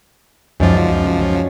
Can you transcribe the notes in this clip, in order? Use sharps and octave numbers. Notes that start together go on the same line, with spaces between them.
C#2 F#2 F3 D#4 D5
C#5